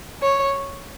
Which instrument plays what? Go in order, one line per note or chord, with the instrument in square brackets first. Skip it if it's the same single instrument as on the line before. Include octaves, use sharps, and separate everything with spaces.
[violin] C#5